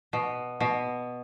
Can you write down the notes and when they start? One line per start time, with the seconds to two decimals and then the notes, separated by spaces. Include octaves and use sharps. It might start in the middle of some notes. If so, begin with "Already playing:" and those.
0.13 B2
0.60 B2